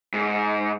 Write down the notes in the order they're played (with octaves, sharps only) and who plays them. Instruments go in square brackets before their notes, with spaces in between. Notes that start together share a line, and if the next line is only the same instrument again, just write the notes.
[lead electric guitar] G#2